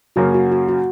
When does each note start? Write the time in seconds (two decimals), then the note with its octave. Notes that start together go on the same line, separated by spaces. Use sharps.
0.16 F#2 C#3 A#3 C#4 F#4
0.34 F#4
0.51 F#4
0.68 F#4